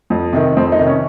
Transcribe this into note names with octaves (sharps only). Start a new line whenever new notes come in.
F2
C3 D#3
F2 C4
D#4
C3 D#3
C#4